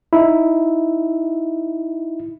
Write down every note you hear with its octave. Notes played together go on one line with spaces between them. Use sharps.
D#4 E4